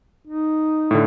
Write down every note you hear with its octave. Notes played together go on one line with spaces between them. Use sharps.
D#4
A2 D3